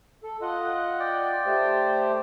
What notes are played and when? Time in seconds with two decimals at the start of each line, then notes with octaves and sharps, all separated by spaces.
0.24 A4
0.41 F4 D#5 F#5
1.00 D5 G5
1.46 A3 G4 C5